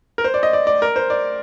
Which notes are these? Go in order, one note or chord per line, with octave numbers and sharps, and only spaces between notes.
A#4
C5
D5
D#5
D5
D5
A#4
C5
D5